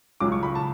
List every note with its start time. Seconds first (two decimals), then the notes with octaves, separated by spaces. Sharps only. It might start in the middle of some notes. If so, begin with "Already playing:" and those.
0.20 C#2 C#3 F#3 D6
0.32 C#6
0.43 B5
0.55 A5